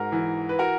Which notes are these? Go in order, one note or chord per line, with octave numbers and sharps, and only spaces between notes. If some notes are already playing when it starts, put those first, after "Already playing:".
Already playing: G#2 F#4 A#4
E3
B4
F#4 A#4